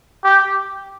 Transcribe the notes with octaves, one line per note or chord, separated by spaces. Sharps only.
G4